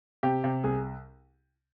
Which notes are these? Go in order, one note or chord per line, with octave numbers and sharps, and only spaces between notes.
C3 G4
C3
C2 G#4